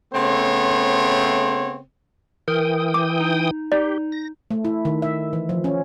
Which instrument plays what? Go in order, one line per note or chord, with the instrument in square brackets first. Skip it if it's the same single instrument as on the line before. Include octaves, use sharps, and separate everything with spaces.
[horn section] C#3 A3 B3 C4 C5 C#5
[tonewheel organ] E3 G5 D#6 [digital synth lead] A#4
[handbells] D6
[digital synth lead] D#4
[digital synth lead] D#4 [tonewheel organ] G4 [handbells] D5
[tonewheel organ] A#6
[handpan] A3
E4
D#3
E5
E3
F3
C#4